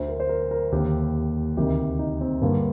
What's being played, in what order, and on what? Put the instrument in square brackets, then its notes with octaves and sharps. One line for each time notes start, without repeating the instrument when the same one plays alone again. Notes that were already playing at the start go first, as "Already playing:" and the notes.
Already playing: [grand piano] D2 D3 C5
A#4
C5
A#4
A#4
D#2 D3 G4
D2 C3 D#3 G4
D#4
C4
G2 D3 A#3